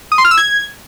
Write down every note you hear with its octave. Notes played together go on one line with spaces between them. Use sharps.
D#6
C6
F6
E6
G#6